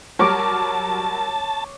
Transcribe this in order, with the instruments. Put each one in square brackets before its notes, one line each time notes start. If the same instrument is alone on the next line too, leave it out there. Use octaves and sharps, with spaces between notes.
[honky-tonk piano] F#3 G3 A#4 [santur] C#5 D6 [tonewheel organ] A5